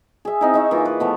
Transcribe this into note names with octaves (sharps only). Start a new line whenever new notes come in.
G#4 E5
C4 D#4 E4
D#4 E5 C#6
E3 A#3 F4
B4
F3 A3 B3